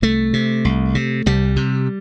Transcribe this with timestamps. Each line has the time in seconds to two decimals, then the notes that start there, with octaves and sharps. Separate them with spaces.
0.02 C2 A3
0.33 C3
0.65 C2
0.95 C3
1.26 C2 G3
1.56 C3